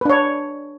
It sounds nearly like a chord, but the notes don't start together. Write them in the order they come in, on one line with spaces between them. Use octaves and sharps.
B4 D4 C#5